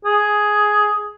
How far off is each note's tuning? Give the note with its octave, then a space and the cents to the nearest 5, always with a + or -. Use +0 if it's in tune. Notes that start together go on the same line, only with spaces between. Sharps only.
G#4 +5